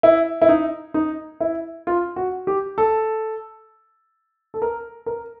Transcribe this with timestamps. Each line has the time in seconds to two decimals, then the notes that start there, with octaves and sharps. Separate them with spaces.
0.03 E4
0.42 E4
0.49 D#4
0.94 D#4
1.41 E4
1.87 F4
2.16 F#4
2.47 G4
2.78 A4
4.54 A4
4.62 A#4
5.06 A#4